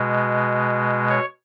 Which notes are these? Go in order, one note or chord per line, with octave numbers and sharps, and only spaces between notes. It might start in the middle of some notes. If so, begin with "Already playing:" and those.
Already playing: B2 G#3
C#5